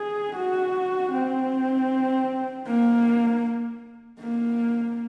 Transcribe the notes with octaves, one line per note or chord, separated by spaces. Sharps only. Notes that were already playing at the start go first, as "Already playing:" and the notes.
Already playing: G#4
F#4
C4
A#3
A#3